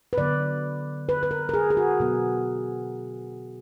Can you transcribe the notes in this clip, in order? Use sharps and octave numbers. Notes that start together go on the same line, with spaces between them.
B4
D3 F#3 B3 D5
B4
B4
A#4
A#4
G#4
G#4
F#4
B2 F#3 B3